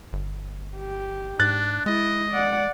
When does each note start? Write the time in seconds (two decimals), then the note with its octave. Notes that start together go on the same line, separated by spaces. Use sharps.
0.13 G1
0.77 G4
1.40 G#2 D4 F#6 A6
1.86 G#3 E4 D#5
2.32 D5 F#5